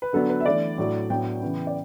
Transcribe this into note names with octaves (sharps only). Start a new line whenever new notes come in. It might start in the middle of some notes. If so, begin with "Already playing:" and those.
B4
D3 F#3 B3 D4 A4
B4
E5
E3 A3 D4 D5
A2 F#3 A3 D4
A2 F#3 B3 D4 G5
C#3 E3 B3
D5